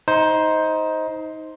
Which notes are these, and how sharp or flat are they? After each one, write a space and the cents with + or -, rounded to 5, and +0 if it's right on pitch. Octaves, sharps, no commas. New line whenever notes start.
D#4 +20 C5 +0 A#5 -10